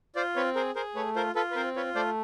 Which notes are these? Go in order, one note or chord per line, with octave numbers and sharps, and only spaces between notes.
F4 C5 D5
C4 B4 C#5
G#4 A#4 C5
G#4 A#4 C5
A3 B4 C#5
F4 A#4 C5
F4 A4 B4
B4
C4 A#4 C5
F4 B4 C#5
A3 C5 D5